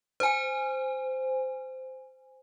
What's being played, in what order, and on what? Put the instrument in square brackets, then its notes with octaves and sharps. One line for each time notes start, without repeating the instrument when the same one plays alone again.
[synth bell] C5 G#5